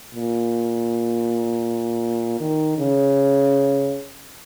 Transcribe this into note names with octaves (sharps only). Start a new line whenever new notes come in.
A#2
D#3
C#3